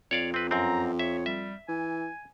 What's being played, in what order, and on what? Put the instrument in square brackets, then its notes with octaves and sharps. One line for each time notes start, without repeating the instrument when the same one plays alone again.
[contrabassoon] F2 [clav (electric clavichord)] C#5 D5 F5
[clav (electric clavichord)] C4 B4
[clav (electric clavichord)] F#2 C4 [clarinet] A#5
[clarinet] C#5 [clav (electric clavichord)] E5
[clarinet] G3 [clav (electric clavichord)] E5
[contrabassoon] E3 [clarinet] G#5